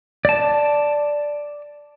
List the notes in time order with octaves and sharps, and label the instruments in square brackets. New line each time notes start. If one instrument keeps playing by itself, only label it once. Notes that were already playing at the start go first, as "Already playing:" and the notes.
[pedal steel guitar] D5 A5